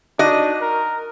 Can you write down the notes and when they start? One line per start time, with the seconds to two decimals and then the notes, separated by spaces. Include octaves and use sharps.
0.19 D4 D#4 F#4 D#5 F#6
0.61 A#4